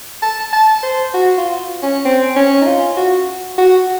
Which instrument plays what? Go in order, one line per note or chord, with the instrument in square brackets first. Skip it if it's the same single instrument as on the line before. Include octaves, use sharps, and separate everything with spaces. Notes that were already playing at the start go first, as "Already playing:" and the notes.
[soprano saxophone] A5
A5
C5
F#4
F4
C#4
C4
C#4
D#4
F4
F#4
F#4